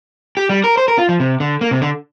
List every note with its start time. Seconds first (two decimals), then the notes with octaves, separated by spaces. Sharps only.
0.37 G4
0.49 G3
0.64 A#4
0.77 C5
0.88 A#4
0.98 F4
1.09 F3
1.20 C3
1.40 D3
1.61 A#3
1.71 C3
1.82 D3